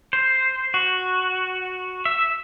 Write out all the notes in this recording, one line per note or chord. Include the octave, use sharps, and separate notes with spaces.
C5
F#4
E5